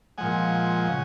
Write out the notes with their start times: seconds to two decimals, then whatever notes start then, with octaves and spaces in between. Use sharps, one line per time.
0.18 A#2 F3 G#3 F#5 G#5
0.88 C#3